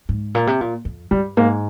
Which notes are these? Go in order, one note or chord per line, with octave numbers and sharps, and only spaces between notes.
G#2
A#2
C3
A#2
F2
G2 G3
G#2 A#3